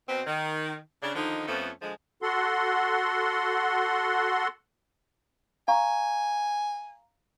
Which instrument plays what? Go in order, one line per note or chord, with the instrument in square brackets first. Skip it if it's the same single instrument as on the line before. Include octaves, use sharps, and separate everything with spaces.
[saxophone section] B2 C4
D#3
C#3 D4
D3 D#3 F3 D#4
F2 F3 A3 B3 C#4
D3 F3 G#3
[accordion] F#4 A4 F#5 C6
[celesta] F5 A#5 C#6 [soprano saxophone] G#5